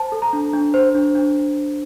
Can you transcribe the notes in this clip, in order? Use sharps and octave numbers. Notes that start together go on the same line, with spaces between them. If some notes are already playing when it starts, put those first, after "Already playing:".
Already playing: C5 A5
A4
A#5
D4
D4
C5
D4
D4